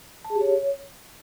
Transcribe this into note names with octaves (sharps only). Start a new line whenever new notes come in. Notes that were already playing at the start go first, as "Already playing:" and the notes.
A5
G#4
G4
C#5